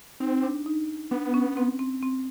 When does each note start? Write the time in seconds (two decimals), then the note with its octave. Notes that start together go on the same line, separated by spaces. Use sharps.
0.20 C4 D#4
0.43 D4
0.66 D#4
1.11 B3 D4
1.34 C#4
1.57 C4
1.79 C4
2.02 C4